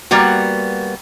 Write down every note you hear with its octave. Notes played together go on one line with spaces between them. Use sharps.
G3 A#3 B3 F#4